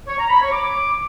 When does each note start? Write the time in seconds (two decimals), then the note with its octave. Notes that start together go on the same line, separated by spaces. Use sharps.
0.07 C#5
0.19 A#5
0.30 B5
0.41 C#5
0.52 D6